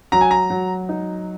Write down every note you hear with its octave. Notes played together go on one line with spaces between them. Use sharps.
F#3 A#5
G#5
A#5
F#3
D#4